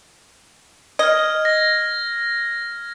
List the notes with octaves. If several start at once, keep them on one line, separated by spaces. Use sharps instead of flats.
D#5 F6 G#6
A#6